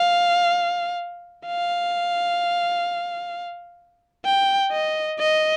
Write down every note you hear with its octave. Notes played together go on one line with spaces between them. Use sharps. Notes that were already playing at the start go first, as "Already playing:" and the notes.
Already playing: F5
F5
G5
D#5
D#5